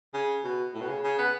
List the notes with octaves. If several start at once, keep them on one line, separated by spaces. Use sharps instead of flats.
C#3
B2
A2
B2
C#3
C#3
B3